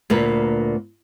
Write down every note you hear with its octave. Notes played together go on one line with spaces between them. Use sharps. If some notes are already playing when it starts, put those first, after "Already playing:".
D2 A#2 A#3 B4